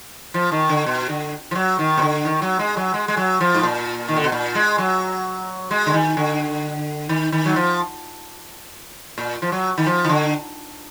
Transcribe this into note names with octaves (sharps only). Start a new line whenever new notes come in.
F3
D#3
D3
B2
D3
F3
F#3
D#3
B2
D3
D#3
F#3
G#3
F#3
G#3
G#3
F#3
F3
G#2
A#2
D#3
D3
B2
A#2
G#3
F#3
G#3
D3
D#3
D3
D#3
D#3
F#3
F3
A#2
F3
F#3
D#3
F3
D#3
D3